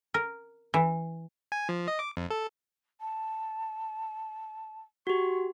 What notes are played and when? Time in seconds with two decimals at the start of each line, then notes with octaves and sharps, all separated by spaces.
0.14 A#4
0.74 E3
1.52 G#5
1.69 F3
1.88 D#5
1.99 D6
2.17 F2
2.30 A4
3.01 A5
5.07 F#4 G4 C#6